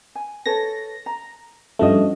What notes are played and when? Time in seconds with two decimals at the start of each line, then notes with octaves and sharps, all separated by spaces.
0.15 G#5
0.46 A4 B4 C#5 A#6
1.06 A#5
1.79 G2 F3 A3 C#4 F#4 D#5